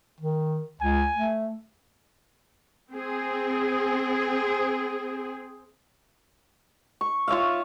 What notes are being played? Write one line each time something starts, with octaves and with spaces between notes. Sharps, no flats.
D#3
C#2 G#5
A3
C4 G#4
C#6
F4 C#5 E5 F5